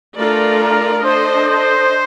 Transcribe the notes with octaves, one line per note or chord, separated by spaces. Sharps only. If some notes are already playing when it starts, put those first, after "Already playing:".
A3 D4 F4 A4 A#4 D5
A#4
D4 A4 C5 D#5
C5